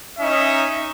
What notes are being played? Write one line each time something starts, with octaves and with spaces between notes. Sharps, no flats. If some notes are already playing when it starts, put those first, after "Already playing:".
C#4 D#4 D#5 E5